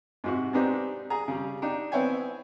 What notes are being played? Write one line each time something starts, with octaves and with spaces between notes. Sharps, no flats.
G#2 C3 F#4
G#3 B3 C4 D4 D#4 G4
G#4 A#5
C#3 G3
D4 D#4 G5
B3 C4 E4 C#5 G5 G#5